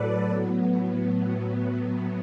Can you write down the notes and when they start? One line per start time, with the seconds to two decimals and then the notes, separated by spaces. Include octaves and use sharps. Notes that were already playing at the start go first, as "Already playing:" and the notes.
Already playing: A2 F#3 A4 B4 D5
0.28 A2 F#3 B3